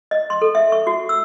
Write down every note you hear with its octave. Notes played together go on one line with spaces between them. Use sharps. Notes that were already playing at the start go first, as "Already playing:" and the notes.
D#5
C6
A4
E5
C#6
F#4
E6